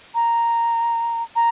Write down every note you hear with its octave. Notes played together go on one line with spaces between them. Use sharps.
A#5
A#5